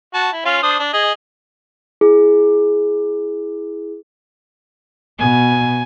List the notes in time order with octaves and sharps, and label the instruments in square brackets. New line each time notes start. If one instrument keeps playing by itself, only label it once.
[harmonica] F#4 A5
E4
C#4 F4 F5
D4 C5 D#6
D4
G#4 D#5
[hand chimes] E4 G#4
[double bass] B2 [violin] G#5